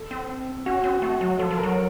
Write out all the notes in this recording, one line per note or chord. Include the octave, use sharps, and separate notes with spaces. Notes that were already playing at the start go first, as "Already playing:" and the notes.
Already playing: A4
C4
C#4 F#4
C4
A3 F#4
F#3
F3 A4
F3
A#4
F#3